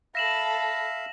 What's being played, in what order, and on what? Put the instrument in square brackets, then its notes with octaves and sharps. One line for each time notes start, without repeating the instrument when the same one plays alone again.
[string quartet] A4 B5 [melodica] E5 F5 [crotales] A#6 E7 F#7